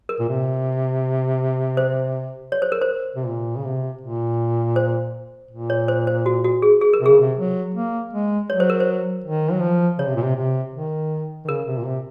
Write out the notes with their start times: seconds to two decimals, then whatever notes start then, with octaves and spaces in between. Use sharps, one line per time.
0.09 A#4
0.20 A#2
0.29 C3
1.77 C5
2.52 C#5
2.62 C5
2.72 A#4
2.81 C5
3.16 C3
3.27 A#2
3.56 C#3
3.65 C3
4.01 A#2
4.76 C5
5.51 A#2
5.70 C#5
5.88 C5
6.07 C5
6.26 F#4
6.44 F#4
6.62 G#4
6.81 G#4
6.93 A#4
7.00 C3
7.06 C#3 G#4
7.20 C3
7.38 F#3
7.74 A#3
8.13 G#3
8.50 F#3 C#5
8.60 C5
8.70 A#4
8.80 C5
9.24 D#3
9.52 F#3
9.62 F3
9.98 C#3 C#5
10.08 C3
10.16 A#2
10.24 C3
10.36 C3
10.74 D#3
11.45 D#3
11.48 C#3 A#4
11.67 C3
11.78 A#2
11.86 C3